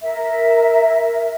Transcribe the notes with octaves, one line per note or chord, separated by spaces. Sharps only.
A#4 E5